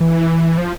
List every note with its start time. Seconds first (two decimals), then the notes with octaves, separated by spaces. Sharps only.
0.01 E3
0.58 F3